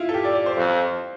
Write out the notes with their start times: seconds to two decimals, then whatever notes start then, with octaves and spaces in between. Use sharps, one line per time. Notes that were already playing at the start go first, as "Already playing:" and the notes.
Already playing: E4 F4
0.09 A4
0.14 G4
0.25 D5
0.35 D5
0.46 C5
0.57 F2 C5